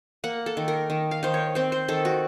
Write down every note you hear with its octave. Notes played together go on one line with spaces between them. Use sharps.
A#3 F#5
A4
D#3
A#4
D#3
F5
D#3 C5
C#5
C4 C5
C5
D#3 A4
F#4